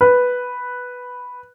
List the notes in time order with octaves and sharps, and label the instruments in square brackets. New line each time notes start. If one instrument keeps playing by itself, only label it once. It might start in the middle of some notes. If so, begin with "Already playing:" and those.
[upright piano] B4